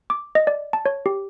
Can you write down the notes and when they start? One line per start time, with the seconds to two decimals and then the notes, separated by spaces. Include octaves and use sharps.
0.10 D6
0.35 D#5
0.47 D5
0.73 A5
0.86 C#5
1.06 G4